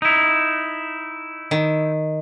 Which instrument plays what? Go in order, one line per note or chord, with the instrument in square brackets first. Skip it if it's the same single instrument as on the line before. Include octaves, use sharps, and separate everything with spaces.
[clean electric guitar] D#4 E4
[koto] D#3